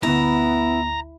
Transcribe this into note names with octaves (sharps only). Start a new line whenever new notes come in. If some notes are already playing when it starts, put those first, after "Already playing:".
G1 D2 B3 E4 A#5